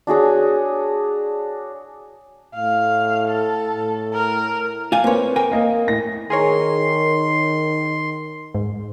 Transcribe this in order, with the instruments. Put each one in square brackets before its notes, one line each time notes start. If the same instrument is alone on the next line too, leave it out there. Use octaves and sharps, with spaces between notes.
[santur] D4 F#4 G#4 C#5
[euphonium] A2 [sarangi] F5
[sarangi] A4
[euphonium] A2
[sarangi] A#4
[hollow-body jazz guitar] F4 F5 G#5
[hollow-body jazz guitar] A#3 C#5 [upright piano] C4 B4
[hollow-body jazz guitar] A#4 G5 G#5
[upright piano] A#3 D#5
A2 A#6
[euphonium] D#3 [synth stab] G#4 A#4 C#5 [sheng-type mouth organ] C6
[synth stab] G#2